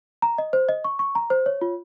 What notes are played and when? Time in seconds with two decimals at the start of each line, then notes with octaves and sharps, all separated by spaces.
0.22 A#5
0.38 D#5
0.53 C5
0.69 D#5
0.84 C#6
0.99 C#6
1.15 A#5
1.30 C5
1.46 C#5
1.61 F4